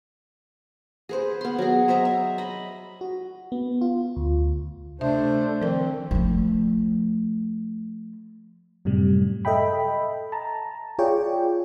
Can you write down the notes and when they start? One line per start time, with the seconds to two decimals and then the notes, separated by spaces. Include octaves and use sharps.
1.09 G#4 B4 C5
1.41 B3 C6
1.58 F#3 G#4
1.88 C5 D#5 E5 A#5
2.05 E5
2.38 D#5 B5
3.01 F#4
3.52 B3
3.81 F4
4.16 D2
5.01 C3 A3 D4 C5 E5
5.62 D#3 F3 C4 A#4 D5
6.11 F3 A3
8.85 F#2 A2 C3 G3
9.45 A4 D#5 E5 G5 B5
10.32 A5 A#5
10.99 F4 G#4 C#5 D5 G5